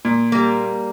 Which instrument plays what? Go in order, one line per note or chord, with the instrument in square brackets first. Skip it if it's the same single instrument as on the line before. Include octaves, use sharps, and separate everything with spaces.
[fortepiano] A#2
[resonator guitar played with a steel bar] G3 A#3